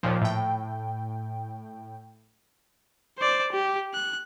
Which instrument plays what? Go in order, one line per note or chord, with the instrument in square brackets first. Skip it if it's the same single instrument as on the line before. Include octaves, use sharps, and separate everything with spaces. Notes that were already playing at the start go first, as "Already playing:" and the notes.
[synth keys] D#2 A#2 F3
A2 G5
[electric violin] C5 D5
G4
F#6